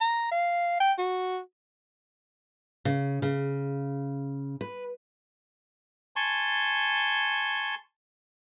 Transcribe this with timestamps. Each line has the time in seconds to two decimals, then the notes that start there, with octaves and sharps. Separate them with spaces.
0.01 A#5
0.31 F5
0.80 G5
0.99 F#4
2.85 C#3
3.22 C#3
4.61 B4
6.16 G#5 A5 C6 C#6